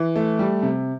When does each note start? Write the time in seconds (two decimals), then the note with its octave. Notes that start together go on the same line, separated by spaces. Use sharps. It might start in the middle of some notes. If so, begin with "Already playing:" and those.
Already playing: E3
0.16 A3
0.39 G3
0.63 C3